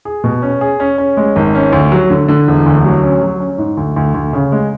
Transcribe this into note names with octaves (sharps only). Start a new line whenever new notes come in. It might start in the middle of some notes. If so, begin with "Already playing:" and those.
G#4
B2
C#4
G#4
C#4
C#4
G#3
G#1
C#4
D2
F#3
D3
D3
E1
D2
F#3
C#4
F#3
C#4
G#2
D2
D2
D2
C#3
G#3